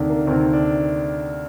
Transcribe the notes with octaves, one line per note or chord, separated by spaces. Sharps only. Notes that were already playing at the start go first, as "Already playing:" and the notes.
Already playing: D2 C3 D#3 D4
A#3
D2 C3 D#3 C4
D4